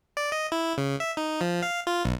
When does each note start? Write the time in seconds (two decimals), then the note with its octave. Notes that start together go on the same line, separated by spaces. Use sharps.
0.17 D5
0.32 D#5
0.52 E4
0.78 C#3
1.00 E5
1.17 D#4
1.41 F3
1.62 F5
1.87 F4
2.05 B1